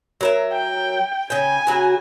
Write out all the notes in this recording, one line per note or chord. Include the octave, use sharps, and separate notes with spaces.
F#3 A#4 E5
G5
C#3 G5 G#5
C#3 F#3 F#4